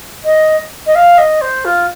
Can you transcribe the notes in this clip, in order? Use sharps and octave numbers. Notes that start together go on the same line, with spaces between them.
D#5
D#5
F5
D#5
C5
F4